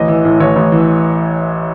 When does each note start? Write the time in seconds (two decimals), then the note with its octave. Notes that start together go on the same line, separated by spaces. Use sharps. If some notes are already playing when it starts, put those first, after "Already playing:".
Already playing: A1 D#5
0.08 E3
0.25 A2
0.40 A1 C#5
0.56 A1
0.72 E3